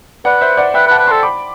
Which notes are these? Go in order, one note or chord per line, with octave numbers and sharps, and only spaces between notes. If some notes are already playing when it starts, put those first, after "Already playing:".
B4 D5 F#5
C5 E5
D5 F#5
B4 E5 G5
B4
F#5 A5
B4
A4 A5 C6
B5 D6